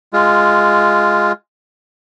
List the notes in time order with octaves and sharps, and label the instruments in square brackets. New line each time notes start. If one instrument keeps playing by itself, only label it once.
[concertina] G#3 F4